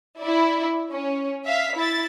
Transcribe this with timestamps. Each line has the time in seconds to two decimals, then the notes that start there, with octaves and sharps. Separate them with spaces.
0.19 E4 D5
0.90 C#4
1.46 E5 F5 B6
1.76 E4 E5 A6